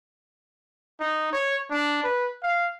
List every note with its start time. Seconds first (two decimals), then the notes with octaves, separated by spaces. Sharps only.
1.00 D#4
1.33 C#5
1.71 D4
2.04 B4
2.43 F5